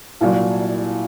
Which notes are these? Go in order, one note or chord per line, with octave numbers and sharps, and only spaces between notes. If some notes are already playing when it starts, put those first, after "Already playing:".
C2 A#2 F#3